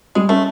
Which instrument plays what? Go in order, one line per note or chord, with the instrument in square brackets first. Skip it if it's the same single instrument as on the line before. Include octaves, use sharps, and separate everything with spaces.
[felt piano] G3 [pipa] G#3
[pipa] A3 [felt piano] C#4